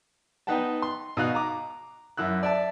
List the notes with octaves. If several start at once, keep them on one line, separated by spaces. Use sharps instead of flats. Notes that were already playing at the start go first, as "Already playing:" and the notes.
B3 D#4 B4 F#5 G5 A5
C6
B2 D#4 F#4 F5 F#6
A#5 D6
F#2 E4 E6 F#6
D5 E5 A5